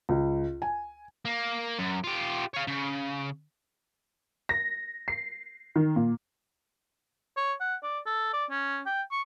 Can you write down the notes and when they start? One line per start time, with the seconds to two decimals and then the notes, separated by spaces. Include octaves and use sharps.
0.09 C#2
0.62 G#5
1.25 A#3
1.79 F#2
2.04 F4 G4
2.54 C#5 F5
2.68 C#3
4.49 A#6
5.08 C7
5.76 D#3
5.96 A#2
7.37 C#5
7.60 F#5
7.83 D5
8.06 A4
8.33 D5
8.50 C#4
8.86 G5
9.11 C#6